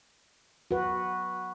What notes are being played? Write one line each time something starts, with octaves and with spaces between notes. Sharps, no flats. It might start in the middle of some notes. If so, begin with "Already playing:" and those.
F#4 B4